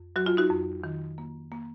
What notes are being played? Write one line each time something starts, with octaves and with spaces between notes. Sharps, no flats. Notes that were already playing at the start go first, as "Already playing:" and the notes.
Already playing: F2
F#3 F#4
F4
D#4 F#4
F2
D#3
A#3
A#3